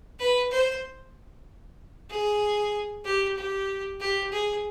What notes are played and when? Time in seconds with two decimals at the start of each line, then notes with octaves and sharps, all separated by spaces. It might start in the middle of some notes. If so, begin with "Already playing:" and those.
0.19 B4
0.51 C5
2.10 G#4
3.05 G4
3.37 G4
4.00 G4
4.32 G#4